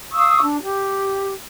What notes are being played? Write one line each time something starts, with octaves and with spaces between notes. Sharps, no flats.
F5 C#6 D#6 E6
D4
G4